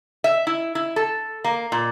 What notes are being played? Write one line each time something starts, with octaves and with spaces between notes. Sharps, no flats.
E5
E4
E4
A4
A#3
A#2